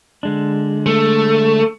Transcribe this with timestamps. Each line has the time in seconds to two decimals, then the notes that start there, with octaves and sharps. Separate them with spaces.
0.23 D3 G#3 D4
0.86 A3